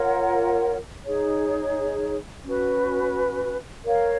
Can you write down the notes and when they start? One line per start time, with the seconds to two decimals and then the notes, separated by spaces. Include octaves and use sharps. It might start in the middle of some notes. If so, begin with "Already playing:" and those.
Already playing: F4 A#4 C#5 F#5
1.05 D#4 G#4 C#5
2.45 C#4 F#4 B4
3.84 A#4 C#5 F5